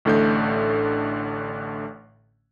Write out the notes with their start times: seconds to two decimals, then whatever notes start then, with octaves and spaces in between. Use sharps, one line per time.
0.05 A1 A2 D3 A3 G6